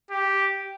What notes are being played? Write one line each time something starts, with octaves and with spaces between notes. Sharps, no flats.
G4